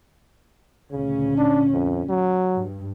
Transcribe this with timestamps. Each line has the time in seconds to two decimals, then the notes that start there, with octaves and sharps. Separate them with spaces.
0.91 D2 A#2 C#3 C#4
1.37 D4
1.73 F2
2.09 F#3
2.54 G2